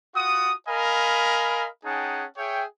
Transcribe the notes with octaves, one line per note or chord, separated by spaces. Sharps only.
F4 F#4 F#5 D#6
A#4 D#5 F5 G#5 B5
C#4 D#4 G#4 F#5 G5 A5
G#4 C#5 E5 G5